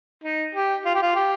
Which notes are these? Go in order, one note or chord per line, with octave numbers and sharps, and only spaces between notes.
D#4
G4
F4
G4
F4
G4